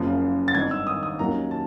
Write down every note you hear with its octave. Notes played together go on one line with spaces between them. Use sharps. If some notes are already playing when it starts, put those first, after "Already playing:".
Already playing: F#1 F#2 C#3 F3
A6
G#1 G2 D#3 G#6
E6
D#6
D#6
D#2 D#3 F#3 A#3 C#4 A#5
A5